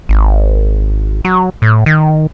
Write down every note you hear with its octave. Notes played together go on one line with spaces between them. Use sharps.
G#1
F#3
A2
D#3